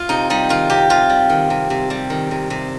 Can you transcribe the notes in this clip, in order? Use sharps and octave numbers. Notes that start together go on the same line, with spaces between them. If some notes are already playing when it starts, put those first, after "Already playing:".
Already playing: F4
C3 D#4
G3 D#4
D#3 F4
C3 G4
C3 F4
G3
D#3
C3
C3
G3
D#3
C3
C3